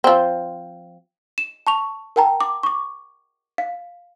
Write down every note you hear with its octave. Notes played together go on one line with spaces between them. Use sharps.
F3 C4
E7
A5 C#6 F7
A#4 F#5 G5 A5 A#5
D6
C#6 D6
F5